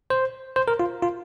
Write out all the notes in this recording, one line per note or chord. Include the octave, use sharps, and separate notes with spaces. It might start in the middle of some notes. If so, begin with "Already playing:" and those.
C5
C5
A#4
F4
F4